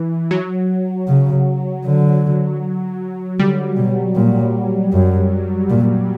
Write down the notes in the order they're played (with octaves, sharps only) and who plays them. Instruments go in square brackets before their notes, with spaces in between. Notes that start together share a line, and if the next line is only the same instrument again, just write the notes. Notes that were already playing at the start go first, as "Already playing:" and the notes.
Already playing: [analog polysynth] E3
F#3
[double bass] C#3
D3
[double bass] D3 [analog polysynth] G3
[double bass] B2
A#2
F#2
A#2